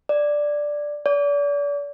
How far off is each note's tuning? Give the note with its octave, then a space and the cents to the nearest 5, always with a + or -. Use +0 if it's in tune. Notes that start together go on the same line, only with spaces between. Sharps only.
D5 +0
D5 -35